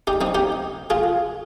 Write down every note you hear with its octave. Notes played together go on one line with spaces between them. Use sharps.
D#4 G4
C4 D#4
D#4 G4
F4 G#4